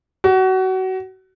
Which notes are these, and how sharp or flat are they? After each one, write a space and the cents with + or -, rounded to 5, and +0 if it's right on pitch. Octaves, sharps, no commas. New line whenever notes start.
F#4 +25